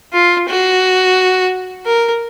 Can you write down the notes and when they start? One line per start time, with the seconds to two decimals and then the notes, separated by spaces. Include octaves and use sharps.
0.13 F4
0.48 F#4
1.86 A#4